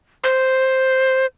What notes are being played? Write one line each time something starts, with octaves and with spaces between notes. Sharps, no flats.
C5